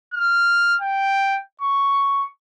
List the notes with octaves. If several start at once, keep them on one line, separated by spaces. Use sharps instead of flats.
F6
G5
C#6